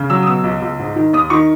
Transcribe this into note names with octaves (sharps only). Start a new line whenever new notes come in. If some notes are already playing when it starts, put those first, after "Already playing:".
Already playing: C#3
F#3 E6
D#6
B2 E6
C#2
C#2
G#2
D#3
D#2 D#6
D#3 C#6